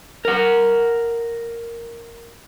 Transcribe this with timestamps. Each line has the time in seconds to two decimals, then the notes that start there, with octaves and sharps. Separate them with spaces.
0.25 A#4 F#5